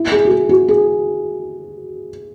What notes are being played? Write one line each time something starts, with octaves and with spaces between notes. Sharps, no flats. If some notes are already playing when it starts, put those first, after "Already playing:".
Already playing: E4
G#4
F#4
G#4
F#4
G#4